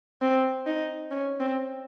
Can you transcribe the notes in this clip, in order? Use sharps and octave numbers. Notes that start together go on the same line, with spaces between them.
C4
D#4
C#4
C4